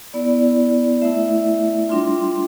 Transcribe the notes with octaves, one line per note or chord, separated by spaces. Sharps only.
B3 E4 D5
A3 E4 E5
G3 D4 F4 C6